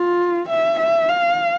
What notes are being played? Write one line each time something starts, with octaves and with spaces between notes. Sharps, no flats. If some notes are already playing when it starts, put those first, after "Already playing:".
Already playing: F4
E5
E5
F5